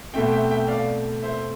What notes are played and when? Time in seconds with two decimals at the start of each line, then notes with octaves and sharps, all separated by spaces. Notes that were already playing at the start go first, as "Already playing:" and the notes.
0.14 B2 A3 C4 E5 G5
0.32 E5 G5
0.51 E5 G5
0.68 D5 F5
1.22 C5 E5